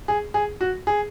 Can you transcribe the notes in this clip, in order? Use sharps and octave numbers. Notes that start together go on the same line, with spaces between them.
G#4
G#4
F#4
G#4